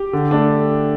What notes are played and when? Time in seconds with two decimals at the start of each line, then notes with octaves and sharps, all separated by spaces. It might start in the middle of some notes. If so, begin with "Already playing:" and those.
Already playing: G4
0.13 D3
0.31 A3 D4